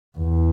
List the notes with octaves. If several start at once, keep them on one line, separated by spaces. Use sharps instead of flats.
E2